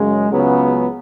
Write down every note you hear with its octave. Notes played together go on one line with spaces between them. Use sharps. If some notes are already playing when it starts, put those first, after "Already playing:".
Already playing: F#2 C#3 G#3
C#2 C#3 F#3 B3